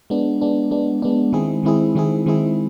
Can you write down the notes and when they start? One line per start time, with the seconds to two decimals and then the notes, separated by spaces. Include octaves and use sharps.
0.10 G#3 B3 D4
0.41 G#3 B3 D4
0.71 G#3 B3 D4
1.02 G#3 B3 D4
1.33 D#3 G#3 C4 E4 G#4
1.63 D#3 G#3 C4 E4 G#4
1.95 D#3 G#3 C4 E4 G#4
2.26 D#3 G#3 C4 E4 G#4